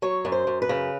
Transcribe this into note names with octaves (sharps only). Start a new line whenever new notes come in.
F#3 C#5
F#2
C5
F#2
B4
C#3